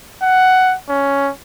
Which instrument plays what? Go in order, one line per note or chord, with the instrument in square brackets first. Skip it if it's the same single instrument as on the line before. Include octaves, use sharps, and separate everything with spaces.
[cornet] F#5
C#4